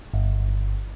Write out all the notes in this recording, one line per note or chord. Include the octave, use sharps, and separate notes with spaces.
G1